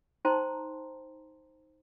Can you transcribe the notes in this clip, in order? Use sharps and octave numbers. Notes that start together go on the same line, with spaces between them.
D#4 C5 G5 A5 A#5 C6